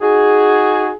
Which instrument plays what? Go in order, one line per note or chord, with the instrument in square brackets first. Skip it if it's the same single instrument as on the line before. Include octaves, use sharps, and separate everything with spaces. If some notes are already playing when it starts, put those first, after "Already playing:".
[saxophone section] D#4 F#4 G#4